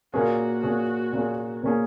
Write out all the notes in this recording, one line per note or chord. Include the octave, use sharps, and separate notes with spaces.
A#2 A#3 C#4 F#4 G#4
A#2 A#3 C#4 G#4
A#2 A#3 C#4 G#4
A#2 A#3 C#4 G#4